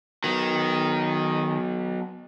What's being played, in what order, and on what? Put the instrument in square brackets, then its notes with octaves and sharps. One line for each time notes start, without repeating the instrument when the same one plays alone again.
[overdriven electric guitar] D#3 [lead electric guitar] F#3 B3